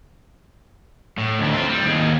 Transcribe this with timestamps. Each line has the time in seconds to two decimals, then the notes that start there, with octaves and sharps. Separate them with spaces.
1.18 A2
1.39 D2 D#3
1.53 C4 F4
1.69 G3
1.86 D#2 G#4